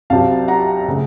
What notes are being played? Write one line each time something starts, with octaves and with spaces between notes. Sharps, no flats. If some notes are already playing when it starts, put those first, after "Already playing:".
C2 C3 F#3 F5 A5
F#5 A#5
C#3 A3